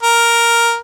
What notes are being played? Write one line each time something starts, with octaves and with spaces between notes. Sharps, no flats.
A#4